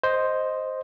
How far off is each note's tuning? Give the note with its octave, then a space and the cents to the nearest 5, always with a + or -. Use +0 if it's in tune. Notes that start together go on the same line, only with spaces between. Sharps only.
C5 +0 D#5 +0